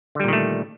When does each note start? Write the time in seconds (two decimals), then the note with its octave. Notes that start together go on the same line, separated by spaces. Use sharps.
0.15 D3
0.20 G3
0.24 A#2
0.28 D#3
0.33 A3